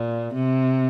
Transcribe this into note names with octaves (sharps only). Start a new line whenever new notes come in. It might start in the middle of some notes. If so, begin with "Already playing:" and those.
Already playing: A#2
C3